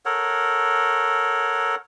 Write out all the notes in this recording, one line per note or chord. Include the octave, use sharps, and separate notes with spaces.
A4 A#4 C#5 F#5